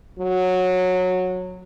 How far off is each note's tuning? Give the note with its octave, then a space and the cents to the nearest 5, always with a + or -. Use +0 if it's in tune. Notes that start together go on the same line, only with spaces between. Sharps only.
F#3 -15